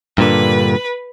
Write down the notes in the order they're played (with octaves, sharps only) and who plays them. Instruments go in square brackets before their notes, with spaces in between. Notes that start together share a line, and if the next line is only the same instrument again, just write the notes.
[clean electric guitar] G2 A#2 D3 [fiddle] B4